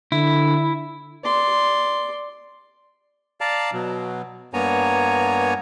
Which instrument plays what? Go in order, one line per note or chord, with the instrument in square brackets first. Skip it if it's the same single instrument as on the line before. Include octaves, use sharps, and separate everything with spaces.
[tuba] D3 [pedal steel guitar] E4
[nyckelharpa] D5 C6
[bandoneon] D5 F5 A5 A#5
B2 F#3
G2 A#3 B3 C#5 G#5 A#5